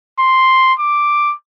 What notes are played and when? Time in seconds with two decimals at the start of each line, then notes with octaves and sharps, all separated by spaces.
0.19 C6
0.80 D6